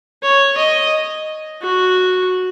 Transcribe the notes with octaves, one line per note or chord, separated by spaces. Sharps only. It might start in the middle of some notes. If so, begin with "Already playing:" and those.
C#5
D#5
F#4